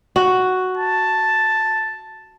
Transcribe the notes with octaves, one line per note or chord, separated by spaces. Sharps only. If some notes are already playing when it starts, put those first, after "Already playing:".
F#4
A5